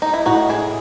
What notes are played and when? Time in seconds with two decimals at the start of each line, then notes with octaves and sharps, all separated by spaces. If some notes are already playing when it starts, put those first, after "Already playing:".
0.02 D#4
0.14 E4
0.26 A2 D#4 F#4
0.49 E4 G#4